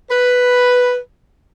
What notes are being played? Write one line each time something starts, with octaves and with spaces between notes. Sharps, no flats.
B4